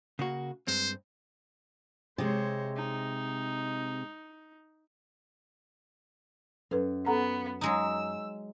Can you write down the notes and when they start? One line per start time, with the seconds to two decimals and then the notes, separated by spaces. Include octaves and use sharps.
0.19 C#3 A#3 F#4
0.67 G2 G#3 C4 C5
2.18 C3 G#3 C5 C#5
2.76 D#4
6.71 F#2 A4 B4
7.06 B3 A4 F#5 A#5
7.61 F#3 G#3 D#4 E6